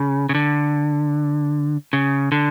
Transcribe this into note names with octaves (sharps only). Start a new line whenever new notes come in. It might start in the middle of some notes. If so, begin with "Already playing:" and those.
Already playing: C#3
C#3
D3
C#3
D3